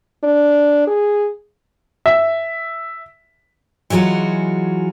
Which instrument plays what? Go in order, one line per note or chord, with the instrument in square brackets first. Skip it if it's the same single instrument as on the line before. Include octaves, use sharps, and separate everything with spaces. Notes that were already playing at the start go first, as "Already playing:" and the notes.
[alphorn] D4
G#4
[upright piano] E5
[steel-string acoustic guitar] E3 F#3 G#3 F4 F#4